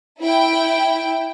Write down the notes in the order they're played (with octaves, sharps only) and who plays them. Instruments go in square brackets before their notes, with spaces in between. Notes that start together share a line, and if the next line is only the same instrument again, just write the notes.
[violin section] E4 G5